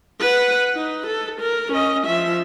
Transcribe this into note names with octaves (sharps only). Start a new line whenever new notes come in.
B4 F#5
D#4
A4
A#4
C#4 D#5
F3 E5